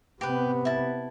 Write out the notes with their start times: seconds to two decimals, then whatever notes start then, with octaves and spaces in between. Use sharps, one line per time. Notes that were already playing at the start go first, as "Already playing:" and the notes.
0.21 C3 B3 G4 B4
0.65 E4 A5